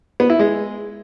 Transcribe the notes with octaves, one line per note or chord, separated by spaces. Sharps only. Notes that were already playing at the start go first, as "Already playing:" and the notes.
B3
E4
G#3